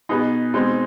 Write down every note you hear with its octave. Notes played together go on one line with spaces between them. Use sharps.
B2 B3 D#4 G#4
B2 G#3 C4 D#4